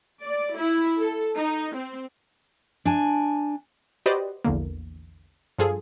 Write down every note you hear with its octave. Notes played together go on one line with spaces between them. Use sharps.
D5
E4
A4
D#4
C4
D4 G#5
F#4 G4 B4 C5 D5 D#5
A#1 E2 D3 A#3
G2 F3 F4 G#4 A4